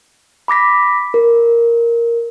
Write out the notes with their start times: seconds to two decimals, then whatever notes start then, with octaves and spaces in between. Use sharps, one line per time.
0.48 B5 D6 A#6 B6
1.14 A#4